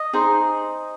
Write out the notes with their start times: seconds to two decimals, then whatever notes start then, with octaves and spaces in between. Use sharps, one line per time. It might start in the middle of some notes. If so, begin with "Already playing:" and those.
Already playing: D#5
0.13 D#4 G#4 C5